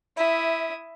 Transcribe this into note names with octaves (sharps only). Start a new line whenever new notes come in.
E4 E5 D#6